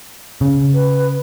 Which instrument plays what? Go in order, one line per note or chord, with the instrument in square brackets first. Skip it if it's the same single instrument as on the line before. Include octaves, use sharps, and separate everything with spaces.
[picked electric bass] C#3
[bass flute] B4